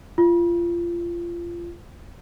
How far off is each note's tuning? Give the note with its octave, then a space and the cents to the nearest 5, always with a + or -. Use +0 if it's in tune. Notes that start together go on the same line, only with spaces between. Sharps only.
F4 -25